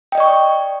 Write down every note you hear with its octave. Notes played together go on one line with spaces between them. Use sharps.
D5 D#5 G5 C#6